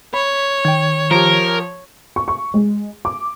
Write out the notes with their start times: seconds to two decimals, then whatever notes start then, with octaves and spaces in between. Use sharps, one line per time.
0.14 C#5 B5
0.65 D#3 G5 G#6
1.11 F3 G4 A#4
2.16 C#6
2.28 C#6
2.54 G#3
3.05 D6